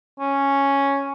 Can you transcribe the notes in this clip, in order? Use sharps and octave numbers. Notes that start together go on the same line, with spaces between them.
C#4